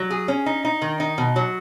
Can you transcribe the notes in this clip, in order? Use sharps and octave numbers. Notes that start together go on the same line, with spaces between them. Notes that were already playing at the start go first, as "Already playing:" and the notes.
Already playing: F#3
G#4
C#4
D#4
D#4
D#3
D#4
B2
F#3